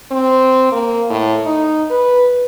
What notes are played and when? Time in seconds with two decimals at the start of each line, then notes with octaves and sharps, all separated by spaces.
0.11 C4
0.72 A#3
1.10 A2
1.46 D#4
1.90 B4